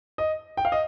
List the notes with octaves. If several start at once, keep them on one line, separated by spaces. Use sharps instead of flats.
D#5
G5
F5
D#5